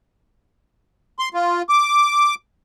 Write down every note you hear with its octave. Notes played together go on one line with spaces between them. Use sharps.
C6
F4
D6